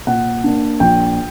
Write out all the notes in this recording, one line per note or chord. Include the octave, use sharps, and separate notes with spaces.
A#2 F#5
A#3 D4
A#1 G5